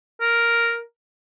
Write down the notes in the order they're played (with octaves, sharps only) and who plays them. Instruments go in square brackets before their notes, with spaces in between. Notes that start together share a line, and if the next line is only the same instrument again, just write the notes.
[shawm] A#4